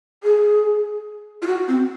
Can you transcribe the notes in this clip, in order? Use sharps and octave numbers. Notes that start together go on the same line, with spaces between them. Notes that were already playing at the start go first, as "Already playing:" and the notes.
G#4
F4
F#4
C4